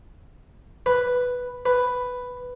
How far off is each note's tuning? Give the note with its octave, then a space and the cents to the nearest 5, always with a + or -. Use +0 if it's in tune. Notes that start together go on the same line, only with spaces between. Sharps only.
B4 +0
B4 +5